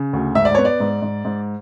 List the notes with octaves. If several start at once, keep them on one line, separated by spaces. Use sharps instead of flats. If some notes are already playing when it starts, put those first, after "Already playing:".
Already playing: C#3
D2
G#2 E5
D5
B3 C#5
D5
G#2
G#2
G#2